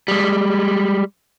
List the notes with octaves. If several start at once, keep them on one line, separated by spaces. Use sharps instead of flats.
G3 G#3